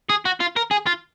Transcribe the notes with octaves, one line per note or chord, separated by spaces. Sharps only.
G#4
F#4
F4
A#4
G#4
F4